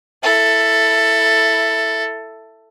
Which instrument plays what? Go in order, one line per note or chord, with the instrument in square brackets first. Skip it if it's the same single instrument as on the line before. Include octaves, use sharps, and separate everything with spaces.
[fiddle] E4 A4